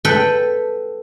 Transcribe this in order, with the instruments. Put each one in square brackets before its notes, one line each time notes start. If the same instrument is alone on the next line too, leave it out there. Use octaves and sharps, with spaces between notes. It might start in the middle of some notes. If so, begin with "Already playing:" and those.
[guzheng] A4 B4 G5 B5